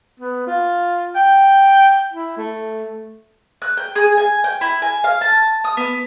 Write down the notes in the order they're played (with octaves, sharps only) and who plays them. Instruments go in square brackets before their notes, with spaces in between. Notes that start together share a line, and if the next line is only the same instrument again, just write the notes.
[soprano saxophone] B3
F4
G5
E4
A3
[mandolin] F#6
G5
G#4
G#5
G5
E4
G#5
F5
A5
D#6
B3